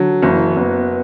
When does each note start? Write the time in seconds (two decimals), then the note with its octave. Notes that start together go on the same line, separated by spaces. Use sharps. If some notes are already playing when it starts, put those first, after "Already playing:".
Already playing: D3 F#3 D4
0.23 F#1 E3 E4
0.56 F#1 B3 B4